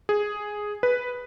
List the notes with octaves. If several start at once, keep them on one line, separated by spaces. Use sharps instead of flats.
G#4
B4